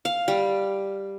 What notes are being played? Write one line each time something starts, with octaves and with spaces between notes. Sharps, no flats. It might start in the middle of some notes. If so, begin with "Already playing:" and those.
F5
G3